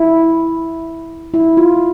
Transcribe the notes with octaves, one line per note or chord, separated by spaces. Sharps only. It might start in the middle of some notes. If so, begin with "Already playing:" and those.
Already playing: E4
E4
F4